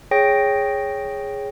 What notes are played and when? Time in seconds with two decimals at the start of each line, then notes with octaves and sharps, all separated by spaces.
0.11 G#4 C#5 G5 A#6 D7